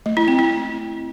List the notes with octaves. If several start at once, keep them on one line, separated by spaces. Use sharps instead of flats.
A3
E4
C4
E4